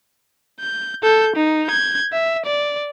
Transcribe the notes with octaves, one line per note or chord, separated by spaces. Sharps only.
G6
A4 G6
D#4
G6 G#6
E5
D5